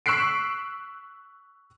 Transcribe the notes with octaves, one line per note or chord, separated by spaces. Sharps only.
C#6 E6 F#6 B6 C7 D7